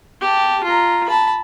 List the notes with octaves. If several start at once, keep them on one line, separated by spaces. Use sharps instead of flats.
G4 A5
F4 A#5
A5 B5